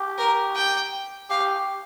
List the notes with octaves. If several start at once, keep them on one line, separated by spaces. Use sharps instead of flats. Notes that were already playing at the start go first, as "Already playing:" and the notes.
Already playing: G4
A#4
G5
G4 F5